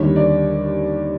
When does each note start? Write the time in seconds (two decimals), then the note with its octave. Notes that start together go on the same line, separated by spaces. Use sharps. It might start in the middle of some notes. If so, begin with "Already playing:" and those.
Already playing: D#2 D3 G3 C#5
0.16 D5